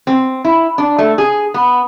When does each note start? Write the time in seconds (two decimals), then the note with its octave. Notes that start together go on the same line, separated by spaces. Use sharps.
0.07 C4
0.45 E4
0.78 D4
0.98 A3
1.18 G#4
1.54 B3